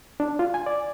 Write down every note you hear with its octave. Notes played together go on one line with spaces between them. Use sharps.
D4
F4
G#5
D5